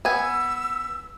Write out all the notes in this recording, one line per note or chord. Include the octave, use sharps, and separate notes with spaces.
B3 G#5 E6